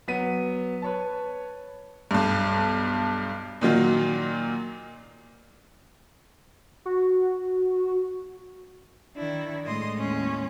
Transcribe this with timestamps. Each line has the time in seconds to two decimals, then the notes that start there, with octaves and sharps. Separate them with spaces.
0.08 F#3 B3 B6 D#7
0.82 B4 C#5 A5
2.11 B1 G2
3.61 A#2 D#3 F#3 F4
6.86 F#4
9.16 D#3 D4 E4
9.66 A2 G#3 D#5 C6
9.98 D#2 C#4